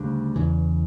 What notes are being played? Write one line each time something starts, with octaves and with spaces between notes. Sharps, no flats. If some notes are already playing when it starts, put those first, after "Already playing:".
Already playing: D2 C#3 G3 D4
E2 C#3 E3